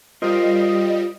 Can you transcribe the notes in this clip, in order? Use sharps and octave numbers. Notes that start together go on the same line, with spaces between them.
G3 F4 A#4 C5 D#5